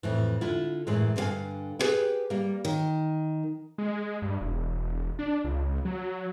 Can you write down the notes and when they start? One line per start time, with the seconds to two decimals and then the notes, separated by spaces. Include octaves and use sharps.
0.03 F2 A2 E3
0.41 D3 E4 F4
0.87 F#2 A2 E3 G#3
1.16 G2 D3 D#4 F#4 F5 G#5
1.79 E4 G4 G#4 B4 G#5
2.30 G3 A#3
2.65 D#3
3.78 G#3
4.22 G2
4.41 E1
5.19 D4
5.44 C#2
5.85 F#3